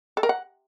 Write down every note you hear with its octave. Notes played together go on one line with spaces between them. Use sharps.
A4
A#4
F#5